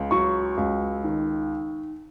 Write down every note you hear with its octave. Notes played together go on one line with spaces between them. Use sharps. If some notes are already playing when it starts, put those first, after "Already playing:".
Already playing: C#2
F#3 C#6
C#2
D#3